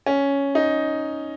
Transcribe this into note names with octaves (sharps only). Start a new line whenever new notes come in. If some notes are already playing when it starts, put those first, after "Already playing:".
C#4
D#4